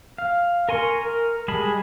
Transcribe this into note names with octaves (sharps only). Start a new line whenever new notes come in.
F5
A#4 G#5 C6 C#6
A#4
G3 G#3 G#4 A5 B5